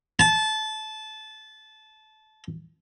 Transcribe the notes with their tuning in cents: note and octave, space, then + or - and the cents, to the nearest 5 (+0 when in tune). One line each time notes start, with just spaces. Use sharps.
A5 -20